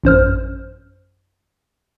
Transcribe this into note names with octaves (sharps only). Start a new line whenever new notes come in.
A1 F#2 C5 F6